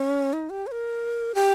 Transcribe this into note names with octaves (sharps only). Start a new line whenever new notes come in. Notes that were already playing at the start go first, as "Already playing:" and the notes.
Already playing: C#4
D#4
G4
C#5
A#4
G4